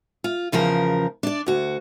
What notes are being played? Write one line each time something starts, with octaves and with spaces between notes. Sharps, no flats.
F4
E2 C#3 F3 A#4
D4 D5
D2 F#4